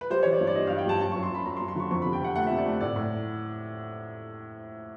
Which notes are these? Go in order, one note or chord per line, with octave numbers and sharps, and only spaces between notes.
B4
G3 C5
E3 C#5
D5
G2
D5
G3 D#5
G2 F5
G5
G2 A5
F#2 A5
F#2 C#6
C6
F#2 B5
F#2 A#5
C6
F#2
C6
D3 C#6
F2 C#6
C3 B5
G5
C3 F#5
A3 F#5
C3 E5
D5
A3
A2 D5
A2